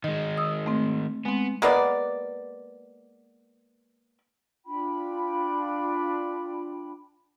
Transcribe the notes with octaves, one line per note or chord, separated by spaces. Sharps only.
D#3 G#3 D#5
D#6 E6
A3 C4
G#3 B3 C4
G#3 A#3 B3 D5
D4 F4 G5 B5